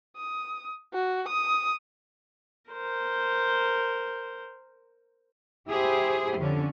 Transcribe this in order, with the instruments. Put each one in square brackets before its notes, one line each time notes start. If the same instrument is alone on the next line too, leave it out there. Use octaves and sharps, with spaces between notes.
[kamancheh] D#6
F#4
D#6
[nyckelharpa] A#4 C5
[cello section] E4 G4 G#4 C5
F2 D3 C#4